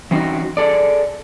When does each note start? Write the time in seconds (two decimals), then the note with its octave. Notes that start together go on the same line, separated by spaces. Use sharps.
0.11 E3 C4 C#4 D#4 F#4
0.57 G#4 A4 D5